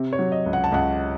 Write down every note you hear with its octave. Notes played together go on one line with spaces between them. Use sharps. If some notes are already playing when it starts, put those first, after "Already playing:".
Already playing: C3
C#5
F#3
D#5
C#2
F#5
A5
C#2 F#5